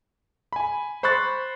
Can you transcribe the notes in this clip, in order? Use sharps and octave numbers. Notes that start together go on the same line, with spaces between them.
G#5 B5
C5 B5 C#6 F#6 A6